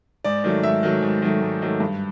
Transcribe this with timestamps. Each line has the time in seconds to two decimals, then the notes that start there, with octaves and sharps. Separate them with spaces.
0.24 G#2 D5
0.44 D#3 F#3 A3
0.63 G#2 E5
0.83 D#3 F#3 A3
1.02 G#2
1.22 D#3 F#3 A3
1.42 G#2
1.62 D#3 F#3 A3
1.80 G2